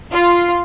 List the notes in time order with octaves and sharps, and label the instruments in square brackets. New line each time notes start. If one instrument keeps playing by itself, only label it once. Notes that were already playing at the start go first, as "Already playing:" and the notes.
[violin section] F4